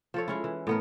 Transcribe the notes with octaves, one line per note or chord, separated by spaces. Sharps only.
F3 A4 C#5
G#3 C#4 E4
E3
A2 B3 A#4